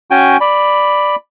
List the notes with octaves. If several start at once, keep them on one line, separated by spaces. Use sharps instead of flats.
C#4 F#4 G5 G#5
D5 B5